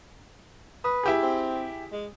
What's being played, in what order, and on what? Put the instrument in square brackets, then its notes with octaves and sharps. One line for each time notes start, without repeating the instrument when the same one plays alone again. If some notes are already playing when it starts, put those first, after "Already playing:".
[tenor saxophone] B4 [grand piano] D#6
[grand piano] E4 G4 G#4
[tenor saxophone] C4
G#3